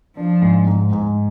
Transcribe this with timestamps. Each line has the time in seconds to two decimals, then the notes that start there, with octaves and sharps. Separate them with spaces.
0.16 F3 D4
0.42 G#2
0.67 G#2
0.92 G#2